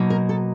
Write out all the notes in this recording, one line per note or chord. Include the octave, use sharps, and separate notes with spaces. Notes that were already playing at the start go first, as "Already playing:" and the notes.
Already playing: B2 F#3 A#3 D#4
A#4
A4